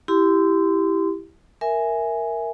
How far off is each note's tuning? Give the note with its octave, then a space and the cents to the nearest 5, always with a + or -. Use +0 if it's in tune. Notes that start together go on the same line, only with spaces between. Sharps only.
E4 +0 G4 +0 C6 -25
A#4 +0 E5 +0 G#5 +0